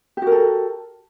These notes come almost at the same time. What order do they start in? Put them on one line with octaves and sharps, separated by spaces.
G4 F#4 A#4 A4